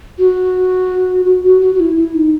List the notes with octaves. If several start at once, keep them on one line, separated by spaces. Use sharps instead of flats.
F#4
F#4
F#4
F#4
F#4
E4
E4
D#4